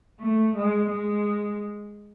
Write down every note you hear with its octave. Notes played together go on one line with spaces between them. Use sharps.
A3
G#3
G#3